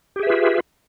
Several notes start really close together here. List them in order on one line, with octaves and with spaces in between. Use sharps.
G4 G#4 E5 B4 F4